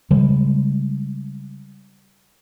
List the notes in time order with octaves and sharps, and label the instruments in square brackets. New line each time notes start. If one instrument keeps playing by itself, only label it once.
[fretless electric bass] C#3 G3 G#3